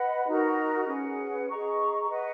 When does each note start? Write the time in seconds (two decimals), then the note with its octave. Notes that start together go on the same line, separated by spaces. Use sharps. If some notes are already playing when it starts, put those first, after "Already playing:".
Already playing: B4 D#5 F#5 B5
0.27 D#4 F#4 A#4
0.87 C#4 G#4 B4 F#5
1.49 G#4 D#5 A#5 C#6
2.09 B4 D#5 F#5